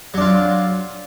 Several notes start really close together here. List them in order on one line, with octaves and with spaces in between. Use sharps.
F#3 D4 F4